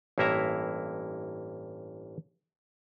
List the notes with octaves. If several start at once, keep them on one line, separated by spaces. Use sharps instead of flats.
A1 G2 A#3 E4 E5 A#5